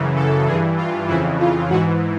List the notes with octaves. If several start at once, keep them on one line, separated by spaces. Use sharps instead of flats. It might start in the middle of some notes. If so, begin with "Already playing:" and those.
Already playing: F#2 C#3 E3
A4
G2 E3 G#4
F4
F2 C#3 E3 E4
F4
G#2 E3 F#4